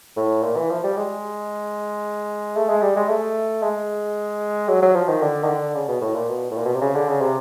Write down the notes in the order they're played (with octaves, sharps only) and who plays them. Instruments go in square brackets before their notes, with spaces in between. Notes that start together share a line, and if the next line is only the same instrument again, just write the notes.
[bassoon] A2
A#2
E3
F3
G3
G#3
A3
G#3
G3
G#3
A3
G#3
F#3
F#3
F3
D#3
D3
D#3
D3
C#3
B2
A2
A#2
B2
A2
A#2
B2
C3
C#3
D3
C#3
C3